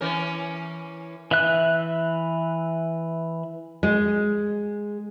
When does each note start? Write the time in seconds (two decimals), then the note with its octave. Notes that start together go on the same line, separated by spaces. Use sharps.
0.01 E3 C#4 A#4
1.31 E3 E5 F#6
3.83 G#3